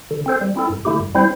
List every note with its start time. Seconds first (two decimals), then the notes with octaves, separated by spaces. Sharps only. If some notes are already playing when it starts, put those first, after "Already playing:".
0.11 D3
0.26 C4 A4 C5
0.41 G3
0.56 C4 E4 A4
0.70 G2
0.85 D3 A3 E4 G4
1.00 G2
1.15 G3 C4 E4 C5